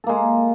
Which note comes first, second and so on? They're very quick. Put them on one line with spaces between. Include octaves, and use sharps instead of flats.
A4 A#3 G#3